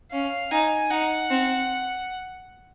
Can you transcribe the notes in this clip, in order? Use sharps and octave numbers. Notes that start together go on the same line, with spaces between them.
C#4 F5
D#4 G#5
D#4 F#5
C4